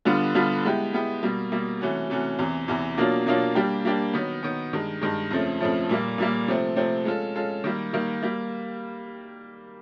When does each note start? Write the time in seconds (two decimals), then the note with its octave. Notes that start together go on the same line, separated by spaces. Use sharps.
0.05 D3 G3 B3 D4 F4
0.35 D3 G3 B3 D4 F4
0.65 G#3 B3 E4 G4
0.93 G#3 B3 E4 G4
1.23 B2 G3 A#3
1.52 B2 G3 A#3
1.81 C3 E3 A3 C#4 F#4
2.10 C3 E3 A3 C#4 F#4
2.39 E2 C3 E3
2.68 E2 C3 E3
2.97 B2 F#3 A#3 D4 F4
3.27 B2 F#3 A#3 D4 F4
3.55 G3 A#3 D4 G4
3.85 G3 A#3 D4 G4
4.14 D#3 F#3 B3
4.43 D#3 F#3 B3
4.73 G2 D#3 G#3
5.01 G2 D#3 G#3
5.31 F2 C#3 F3 A3
5.60 F2 C#3 F3 A3
5.89 A#2 G3 A#3
6.18 A#2 G3 A#3
6.48 C3 F3 A3 C4
6.76 C3 F3 A3 C4
7.05 G#3 C#4 F4 A4
7.35 G#3 C#4 F4 A4
7.64 D#3 G3 A#3
7.93 D#3 G3 A#3
8.22 G3 A#3